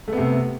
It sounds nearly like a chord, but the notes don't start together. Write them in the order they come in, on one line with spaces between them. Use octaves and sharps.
A3 B3 C3